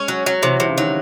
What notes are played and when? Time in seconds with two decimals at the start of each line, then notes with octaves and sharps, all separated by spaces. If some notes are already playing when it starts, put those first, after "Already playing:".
Already playing: G#3 C#4
0.08 F#3
0.26 F#3
0.42 C3 E3
0.60 C3 E3
0.69 C#3
0.78 D#3 F#3